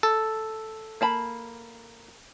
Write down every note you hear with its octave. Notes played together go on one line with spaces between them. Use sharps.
A4
A#3 A5 B5